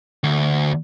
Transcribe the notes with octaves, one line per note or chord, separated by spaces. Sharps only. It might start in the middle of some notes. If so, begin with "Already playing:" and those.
D2